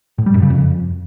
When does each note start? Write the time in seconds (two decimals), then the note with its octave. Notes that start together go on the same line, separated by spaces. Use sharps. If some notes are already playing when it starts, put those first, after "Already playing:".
0.18 A2
0.26 G3
0.34 F#2
0.42 C#3
0.50 F2